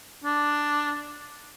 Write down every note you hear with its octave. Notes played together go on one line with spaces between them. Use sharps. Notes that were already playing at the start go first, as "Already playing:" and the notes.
D4